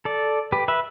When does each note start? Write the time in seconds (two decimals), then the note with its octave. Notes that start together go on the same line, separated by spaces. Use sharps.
0.05 A4 D5
0.52 G4 B4
0.68 B4 E5